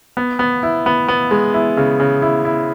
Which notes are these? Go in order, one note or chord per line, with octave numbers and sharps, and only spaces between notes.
B3
B3
E4
B3
B3
G#3
E4
C#3
C#3
E4
E4